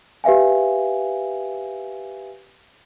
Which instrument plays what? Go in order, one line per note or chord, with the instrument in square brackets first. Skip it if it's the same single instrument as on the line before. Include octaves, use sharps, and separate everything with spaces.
[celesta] G4 B4 E5 F5 G#5